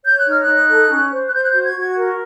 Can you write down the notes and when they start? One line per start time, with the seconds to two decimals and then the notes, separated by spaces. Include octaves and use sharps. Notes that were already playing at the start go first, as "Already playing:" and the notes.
0.05 C#5 G6
0.17 F#6
0.25 D#4 F6
0.40 F#6
0.47 D#4
0.68 A4
0.90 C#4
1.11 C5
1.28 F#6
1.31 C5 G6
1.42 F#6
1.48 G6
1.53 F#4
1.63 G#6
1.75 F#4 G#6
1.96 A#4